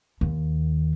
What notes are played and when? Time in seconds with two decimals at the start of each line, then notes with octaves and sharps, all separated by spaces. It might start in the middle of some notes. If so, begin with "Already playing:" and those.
0.21 D#2